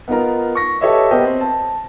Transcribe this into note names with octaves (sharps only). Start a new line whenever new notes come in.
B3 D#4 F4 A#4 A#5
C#6 A#6
G4 A4 B4 C#5 D#5 E5
B3 G4 A#4 C5 D#5 G5
C4
A5